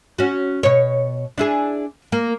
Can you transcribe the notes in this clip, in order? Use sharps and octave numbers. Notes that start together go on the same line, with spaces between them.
C#4 F#4
B2 C#5
D4 E4 G#4
A#3